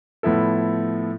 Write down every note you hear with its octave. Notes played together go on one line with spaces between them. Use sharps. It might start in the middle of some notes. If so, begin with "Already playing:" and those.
A2 F3 B3 E4 A4